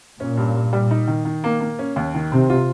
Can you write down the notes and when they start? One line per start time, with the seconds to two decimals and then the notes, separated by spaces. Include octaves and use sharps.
0.20 A#2 C#4
0.37 G2
0.55 G2
0.73 G3
0.91 D#4
1.08 D#3
1.25 D#3
1.44 A#3
1.60 A#3
1.79 C#4
1.96 D#2
2.14 D#3
2.32 C3 C4
2.50 F4